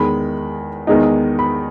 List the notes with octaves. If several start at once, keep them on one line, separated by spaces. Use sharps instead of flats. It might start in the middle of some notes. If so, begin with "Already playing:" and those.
Already playing: E2 D#3 G#3 B5
E2 D#3 G#3 B3 D#4
B5